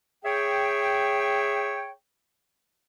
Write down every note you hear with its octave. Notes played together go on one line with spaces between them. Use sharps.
G#4 C#5 E5 G5